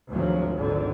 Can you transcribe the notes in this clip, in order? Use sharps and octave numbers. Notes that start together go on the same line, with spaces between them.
G#1 D2 F3 F#3
G#1 D3